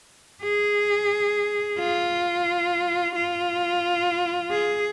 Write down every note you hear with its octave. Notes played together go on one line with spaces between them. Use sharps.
G#4
F4
F4
G#4